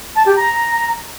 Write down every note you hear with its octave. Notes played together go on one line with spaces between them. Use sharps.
A5
G4
A#5